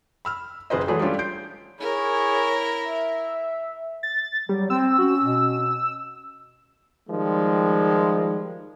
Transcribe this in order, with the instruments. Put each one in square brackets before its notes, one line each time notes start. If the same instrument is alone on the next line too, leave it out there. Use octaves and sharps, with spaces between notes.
[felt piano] B5 E6 F6
F#1 G#4 B4 C5 D#5
E3 F#3 A3 G#4 C5 C#5
G3 A3 C#4 D4 F4 G4
G6 C7 D7
[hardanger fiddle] E4 A#4 [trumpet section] G#4 C#5
[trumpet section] E5
[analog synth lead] A6
[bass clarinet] F#3 [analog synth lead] G3
[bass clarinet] C4 [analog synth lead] E6
[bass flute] C#4 [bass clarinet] F#4
[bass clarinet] B2
[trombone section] D#3 F3 G3 G#3